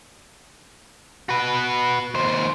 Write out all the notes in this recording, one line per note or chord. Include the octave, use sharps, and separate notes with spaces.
F#4 B4
D#2 C5